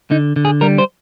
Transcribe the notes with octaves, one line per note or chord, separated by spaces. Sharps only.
D3 D#4
D3
G#4
G3 A#4
C5